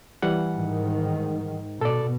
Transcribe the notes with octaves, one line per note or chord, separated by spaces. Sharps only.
E3 G3 F#5
G#2 D#3
B2 A4 D5